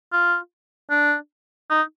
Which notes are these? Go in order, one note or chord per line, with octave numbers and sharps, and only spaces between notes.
F4
D4
D#4